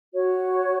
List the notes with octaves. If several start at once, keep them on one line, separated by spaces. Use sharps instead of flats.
F#4 C#5